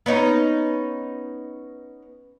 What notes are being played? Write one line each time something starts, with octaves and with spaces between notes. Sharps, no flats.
B3 C#4 D#4